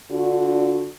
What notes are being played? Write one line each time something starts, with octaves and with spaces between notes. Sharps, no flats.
D3 D4 F4 F#4